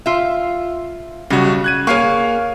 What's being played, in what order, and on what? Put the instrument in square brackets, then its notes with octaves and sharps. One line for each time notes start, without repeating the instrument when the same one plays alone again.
[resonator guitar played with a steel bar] F4 E5
[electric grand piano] B1 G3 F#4 [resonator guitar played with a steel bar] C#3
[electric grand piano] F#6 G#6 D#7
[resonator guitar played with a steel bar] A#3 G#4 [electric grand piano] C#5 F5 C#6